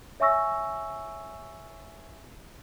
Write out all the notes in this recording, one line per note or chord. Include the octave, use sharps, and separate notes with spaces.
C#5 E5 G#5 C#6 E6 A#6